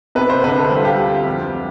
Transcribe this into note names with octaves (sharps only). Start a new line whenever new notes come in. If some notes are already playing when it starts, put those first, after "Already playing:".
C3 B4
C5
D2 B4
A4
G3 G4
F4
G4
D2
F2
G3